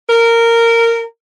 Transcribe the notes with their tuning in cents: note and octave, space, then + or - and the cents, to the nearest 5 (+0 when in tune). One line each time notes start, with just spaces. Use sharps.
A#4 -15